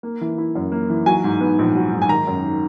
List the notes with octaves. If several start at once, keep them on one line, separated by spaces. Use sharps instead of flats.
A#3
E3
E4
F#2
A#3
E3
F#3 G#5
G#2
B3
A#1
F#3
G#2
G#5
D#3 A#5
F#2